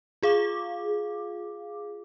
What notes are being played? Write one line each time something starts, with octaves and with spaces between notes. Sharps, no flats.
F4 G#4 F5 D6